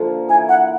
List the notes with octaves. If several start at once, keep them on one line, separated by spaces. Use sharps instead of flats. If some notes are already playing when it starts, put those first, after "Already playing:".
Already playing: D3 F3 A#3
E3 G#5
F#5